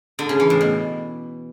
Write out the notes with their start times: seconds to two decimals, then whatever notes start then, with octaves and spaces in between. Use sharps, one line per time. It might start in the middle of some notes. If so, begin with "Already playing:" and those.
0.19 D3
0.29 C#3
0.40 E3
0.50 A2
0.61 B2